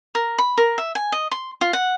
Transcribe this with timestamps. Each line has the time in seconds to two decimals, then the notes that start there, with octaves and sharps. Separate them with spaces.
0.15 A#4
0.38 B5
0.58 A#4
0.78 E5
0.95 G#5
1.12 D#5
1.31 C6
1.61 F4
1.73 F#5